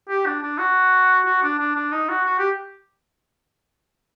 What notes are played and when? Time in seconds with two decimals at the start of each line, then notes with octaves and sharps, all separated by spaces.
0.09 G4
0.26 D4
0.42 D4
0.58 F#4
1.25 F#4
1.42 D4
1.59 D4
1.75 D4
1.92 D#4
2.09 F#4
2.25 F#4
2.38 G4